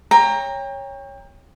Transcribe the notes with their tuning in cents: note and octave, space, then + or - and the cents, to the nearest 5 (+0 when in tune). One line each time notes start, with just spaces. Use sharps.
C#5 +0 G5 +30 A#5 +0